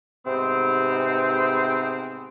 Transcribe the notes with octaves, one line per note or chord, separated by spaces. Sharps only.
G#2 C3 B3 C4